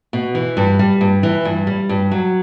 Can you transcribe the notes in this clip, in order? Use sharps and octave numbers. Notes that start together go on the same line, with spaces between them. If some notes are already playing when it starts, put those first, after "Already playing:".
B2
E3
G2
G3
G2
E3
G2
G3
G2
F#3